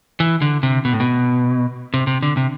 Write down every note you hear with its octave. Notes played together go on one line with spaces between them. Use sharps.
E3
D3
C3
B2
A2
B2
C3
C3
D3
C3